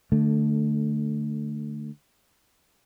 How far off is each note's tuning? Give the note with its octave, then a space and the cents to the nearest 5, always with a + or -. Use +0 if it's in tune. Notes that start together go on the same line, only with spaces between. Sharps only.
D3 +15 A3 +0